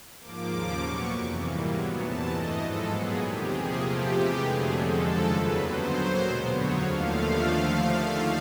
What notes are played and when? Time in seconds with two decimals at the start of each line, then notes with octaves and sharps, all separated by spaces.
0.19 G#2 F3 A#3 D6
0.49 D#2 C#3 F3 A#3
0.80 A#2 F#3 B3 C#6
1.10 F2 C3 E3
1.40 G#2 E3 G3 A#3
1.71 A#2 F#3 B3
2.00 E2 C3 E3 A5
2.31 G2 E3 A3 D#5
2.60 G#2 F3 G#3 A4
2.90 A#2 F#3 B3 G#4
3.20 E2 C3 D#3 G4
3.50 C3 F3 A#3 G#4
3.80 C3 F3 A3 G4
4.10 C3 E3 G#3 B3
4.41 F2 D3 F#3 A3 G#4
4.70 F2 D3 F3 G#3 A4
5.01 D#2 C#3 F3 G#3
5.30 D#2 C#3 F#3 B4
5.61 G2 D3 F#3 B3 C5
5.91 A#2 F#3 A#3
6.20 B2 G#3 B3
6.51 F2 D3 F#3 B3 C#5
6.81 D#2 D3 F3 A3 F5